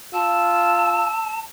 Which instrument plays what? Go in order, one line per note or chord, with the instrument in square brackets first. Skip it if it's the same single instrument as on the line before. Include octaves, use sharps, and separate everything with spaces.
[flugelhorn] F4 [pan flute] A5 [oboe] E6